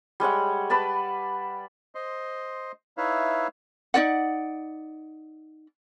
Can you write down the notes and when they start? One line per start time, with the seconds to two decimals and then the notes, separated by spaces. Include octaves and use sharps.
0.20 G3 G#3 C#5 F#5
0.70 B4 D5 A5 B5
1.95 C5 D#5 C6
2.97 D#4 E4 B4 C#5 E5 F5
3.94 D#4 F#4 D5 F#5